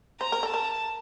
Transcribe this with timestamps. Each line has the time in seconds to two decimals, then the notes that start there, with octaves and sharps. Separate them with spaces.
0.21 C5 A#5
0.32 A#4
0.43 A4
0.49 A#4 A5